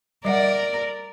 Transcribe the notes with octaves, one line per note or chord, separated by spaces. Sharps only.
G3 A#4 D5 E5 F#5